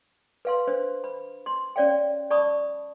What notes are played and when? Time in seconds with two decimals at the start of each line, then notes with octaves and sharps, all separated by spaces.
0.45 B4 F5 C6
0.67 D4 C5
1.04 B5
1.46 C6
1.76 C#4 C#5 D5 F5 G5
2.31 D5 A5 B5 C#6 D#6